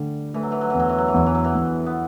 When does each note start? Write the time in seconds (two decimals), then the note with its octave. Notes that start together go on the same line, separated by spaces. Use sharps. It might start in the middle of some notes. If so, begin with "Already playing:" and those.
Already playing: D3 G3 A3
0.34 E3 A3
0.43 F#3
0.52 E3
0.61 F#3
0.70 E2 E3
0.80 F#3
0.89 E3
0.98 F#3
1.08 E3
1.14 E2 F#3
1.26 E3
1.35 F#3
1.44 E3
1.55 E2
1.86 B3